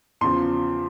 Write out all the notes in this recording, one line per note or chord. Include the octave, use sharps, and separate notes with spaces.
E2 C#3 F3 C6